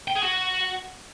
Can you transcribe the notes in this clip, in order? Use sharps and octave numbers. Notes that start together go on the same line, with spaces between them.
G5
G#4
F#4